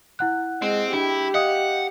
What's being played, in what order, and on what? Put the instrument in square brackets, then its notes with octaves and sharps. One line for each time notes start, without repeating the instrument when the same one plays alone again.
[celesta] E4 F#5 F#6
[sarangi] G#3 [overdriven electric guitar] C4
[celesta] D4 [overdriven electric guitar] E4 [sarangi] G4
[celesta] D#5 F5 D#6 [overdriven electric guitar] F#5